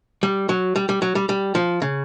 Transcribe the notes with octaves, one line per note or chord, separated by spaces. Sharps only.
G3
F#3
G3
G3
F#3
G3
G3
F3
C#3